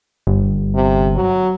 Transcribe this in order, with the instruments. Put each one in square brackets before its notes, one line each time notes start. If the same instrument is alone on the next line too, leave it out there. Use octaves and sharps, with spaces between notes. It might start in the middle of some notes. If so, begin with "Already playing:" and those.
[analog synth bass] G1
[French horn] C3
F#3